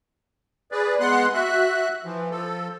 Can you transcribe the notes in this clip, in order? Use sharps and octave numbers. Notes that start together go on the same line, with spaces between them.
G#4 B4 D5
G#3 B3 F#5 C6 F#6
F#4 E5 F#6
E3 F3
F3 A4